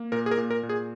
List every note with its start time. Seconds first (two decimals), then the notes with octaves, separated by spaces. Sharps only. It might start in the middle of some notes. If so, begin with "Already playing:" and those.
Already playing: A#3
0.12 A#2 A#4
0.26 G#4
0.31 A#4
0.37 A#2
0.50 A#4
0.63 A#2
0.69 G#4